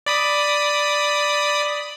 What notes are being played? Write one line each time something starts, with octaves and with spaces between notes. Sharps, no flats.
D5 B5 D#6